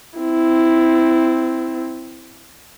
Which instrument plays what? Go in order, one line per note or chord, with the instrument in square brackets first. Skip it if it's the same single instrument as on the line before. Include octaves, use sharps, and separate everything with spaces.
[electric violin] C4 E4